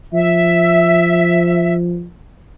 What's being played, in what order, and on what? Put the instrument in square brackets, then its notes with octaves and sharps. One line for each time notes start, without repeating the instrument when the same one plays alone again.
[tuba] F3 [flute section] E5